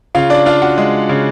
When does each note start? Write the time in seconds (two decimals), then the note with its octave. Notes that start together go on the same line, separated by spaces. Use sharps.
0.15 C#3 F4 F5
0.30 D4 D5
0.46 D4 F4 F5
0.62 F#4 F#5
0.78 G#3
1.09 C#3